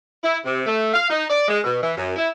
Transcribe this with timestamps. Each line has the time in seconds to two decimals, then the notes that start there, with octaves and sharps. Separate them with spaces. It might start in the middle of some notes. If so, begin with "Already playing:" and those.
0.23 E4
0.44 C3
0.66 A3
0.94 F5
1.10 D#4
1.30 D5
1.48 G#3
1.64 B2
1.82 E3
1.97 F#2
2.16 E4